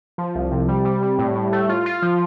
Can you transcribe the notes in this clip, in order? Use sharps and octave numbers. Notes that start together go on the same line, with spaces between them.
F3
C2
C3
G3
G3
G3
A2
A2
A3
F4
F4
F3